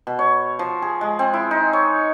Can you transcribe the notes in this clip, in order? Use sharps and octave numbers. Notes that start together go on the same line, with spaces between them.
B2
C#5
F3
G#4
G#3
C4
E4
D#4
C#5